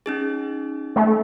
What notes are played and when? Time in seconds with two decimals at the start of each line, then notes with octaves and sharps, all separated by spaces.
0.06 C#4 D#4 G#4
0.96 A3